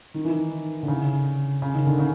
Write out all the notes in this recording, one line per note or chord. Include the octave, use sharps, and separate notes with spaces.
D#3
E3
D#3
D3
C#3
C#3
D#3
D3
C#3